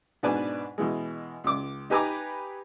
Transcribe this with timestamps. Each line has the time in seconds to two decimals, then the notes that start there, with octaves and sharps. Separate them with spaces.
0.23 G#2 B2 D4 B4 D5 G#5
0.78 B2 E3 G#3
1.44 C#2 D6
1.90 D#4 G4 B4 G#5 A#5 D6